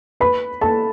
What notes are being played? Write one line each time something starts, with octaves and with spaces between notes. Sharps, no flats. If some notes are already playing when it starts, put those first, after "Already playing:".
B4 B5
A4 A5